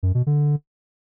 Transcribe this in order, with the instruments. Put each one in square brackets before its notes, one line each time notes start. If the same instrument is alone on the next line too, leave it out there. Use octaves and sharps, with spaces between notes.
[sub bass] F#2
B2
D3